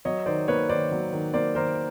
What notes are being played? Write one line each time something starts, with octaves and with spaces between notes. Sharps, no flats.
F#3 C#5 D#5
D#3 C5 D5
A#3 B4 C#5
D#3 C5 D5
F#3
D#3
A#3 C5 D5
D#3 A#4 C5